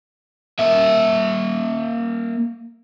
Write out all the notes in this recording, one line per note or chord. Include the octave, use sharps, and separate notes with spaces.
A#3 E5